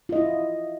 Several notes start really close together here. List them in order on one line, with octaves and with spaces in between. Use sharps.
F4 D#5 E4